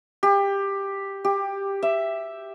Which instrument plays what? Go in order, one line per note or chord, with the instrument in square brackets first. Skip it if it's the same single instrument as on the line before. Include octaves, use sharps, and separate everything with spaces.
[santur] G4
G4
E5